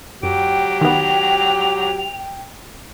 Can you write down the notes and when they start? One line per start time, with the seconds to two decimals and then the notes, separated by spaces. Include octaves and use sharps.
0.23 F#2 F#3 G4 G5 D7
0.81 D#3 B3 F7